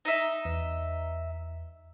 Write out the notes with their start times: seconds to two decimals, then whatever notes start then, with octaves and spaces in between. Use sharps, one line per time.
0.05 D#4 E5
0.45 E2